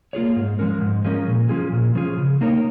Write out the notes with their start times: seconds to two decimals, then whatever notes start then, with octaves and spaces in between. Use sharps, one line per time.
0.13 A#3 F4 G#4 C#5
0.36 G#2
0.59 F3 G#3 C#4 A#4
0.81 G#2
1.05 F3 G#3 C#4 A#4
1.28 A#2
1.49 F3 C#4 F4 G#4
1.72 A#2
1.95 F3 C#4 F4 G#4
2.18 C#3
2.41 A#3 D#4 A#4 C#5